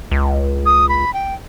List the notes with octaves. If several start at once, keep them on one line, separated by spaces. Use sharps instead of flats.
C#2
D#6
B5
G5